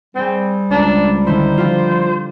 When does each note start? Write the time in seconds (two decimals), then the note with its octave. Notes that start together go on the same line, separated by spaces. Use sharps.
0.15 G3 C4 G#4 C5
0.71 C#2 D4 A5 A#5 A6
1.27 D3 D#3 E4 C5
1.58 F3 F4 G4